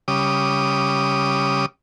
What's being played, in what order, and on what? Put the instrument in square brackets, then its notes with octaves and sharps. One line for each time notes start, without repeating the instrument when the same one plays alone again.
[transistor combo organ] C#3 G3 D6 D#6